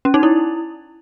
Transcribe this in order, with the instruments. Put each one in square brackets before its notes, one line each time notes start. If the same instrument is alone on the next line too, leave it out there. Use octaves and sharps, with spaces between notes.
[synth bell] C#4
D#4
E4